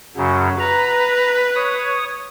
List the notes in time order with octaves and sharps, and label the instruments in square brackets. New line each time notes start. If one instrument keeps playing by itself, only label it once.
[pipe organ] F#2 C#3 [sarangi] F#3
[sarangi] B4 [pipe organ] A#5
[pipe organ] C#5 D#6